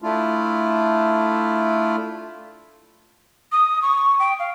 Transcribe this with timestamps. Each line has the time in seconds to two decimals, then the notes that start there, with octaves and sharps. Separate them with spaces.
0.02 A3 D4 E4 F4
3.52 D#6
3.82 C#6
4.20 G5
4.39 F5